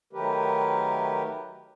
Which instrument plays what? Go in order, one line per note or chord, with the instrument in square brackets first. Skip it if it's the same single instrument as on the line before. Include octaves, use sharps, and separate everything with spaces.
[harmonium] D#3 F#3 A3 G4 A#4 B4